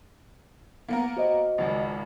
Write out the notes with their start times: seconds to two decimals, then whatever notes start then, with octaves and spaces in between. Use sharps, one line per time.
0.88 A#3 B3 A#4
1.17 F#4 C5 D#5
1.58 G#1 C#2